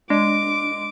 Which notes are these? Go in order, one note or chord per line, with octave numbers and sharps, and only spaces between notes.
G#3 D4 D6